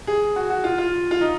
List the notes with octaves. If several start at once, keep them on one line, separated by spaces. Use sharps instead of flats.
G#4
F#4
F#4
F4
F4
F4
D#4